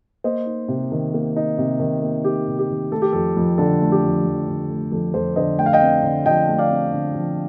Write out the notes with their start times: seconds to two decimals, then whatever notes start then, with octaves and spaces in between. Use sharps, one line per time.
0.24 A#3 C5 D#5
0.46 D#4
0.68 C3
0.92 D#3
1.13 A#3
1.36 D#4
1.58 C3
1.80 D#3
2.02 A#3
2.24 D#4 G4
2.47 C3
2.59 G4
2.69 D#3
2.92 A3 A4
3.02 G4
3.13 F2 A4
3.37 F2
3.58 D3 A4
3.81 A3
3.92 G4
4.03 F2
4.25 F2
4.48 D3
4.70 A3
4.92 F2 A4
5.14 F2 A4 C5
5.36 D3 C5 D#5
5.59 A3 G5
5.66 F5
5.73 D#5 G5
5.82 C4
6.03 D3
6.25 F3 D#5 G5
6.49 A3
6.58 D5 F5
6.71 C4
6.93 D3
7.15 F3